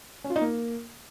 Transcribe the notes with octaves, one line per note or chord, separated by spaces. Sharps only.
C#4
F4
D#4
A#3